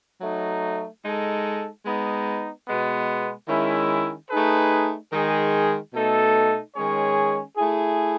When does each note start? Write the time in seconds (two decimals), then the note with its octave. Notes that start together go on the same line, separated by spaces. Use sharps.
0.20 F#3 A3 D#4
1.02 G#3 D#4 A4
1.84 G#3 B3 D#4
2.66 B2 G#3 B3
3.48 D#3 G#3 C#4 E4
4.29 A3 D#4 G#4 B4
5.11 D#3 G#3 D#4 G#4
5.93 B2 A3 D#4 A4
6.75 D#3 G#3 C#4 G#4 C#5
7.56 A3 E4 G#4